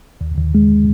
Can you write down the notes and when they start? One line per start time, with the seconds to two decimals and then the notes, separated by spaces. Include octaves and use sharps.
0.21 D#2
0.38 D#2
0.55 G#3